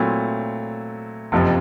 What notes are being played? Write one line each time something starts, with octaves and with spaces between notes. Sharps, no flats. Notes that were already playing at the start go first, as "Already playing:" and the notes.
Already playing: A#2 F#3 A3 C4 E4
F#1 F2 C3 F3